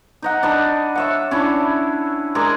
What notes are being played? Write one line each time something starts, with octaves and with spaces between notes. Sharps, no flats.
D#4 D#5 F#5
D4 D#5 B5
C#5 E5 F#5
C#4 D4 E4
G#3 G#4 A#4 D5